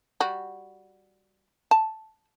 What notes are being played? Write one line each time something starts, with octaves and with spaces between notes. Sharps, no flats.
G3 F#4
A5